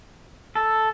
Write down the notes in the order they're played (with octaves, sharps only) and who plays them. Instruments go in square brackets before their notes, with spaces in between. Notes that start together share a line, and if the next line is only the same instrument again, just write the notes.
[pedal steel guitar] A4